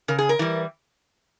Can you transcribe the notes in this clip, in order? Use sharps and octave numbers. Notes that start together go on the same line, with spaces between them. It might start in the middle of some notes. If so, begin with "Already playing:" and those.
C#3 A#4
G#4
A#4
E3 G3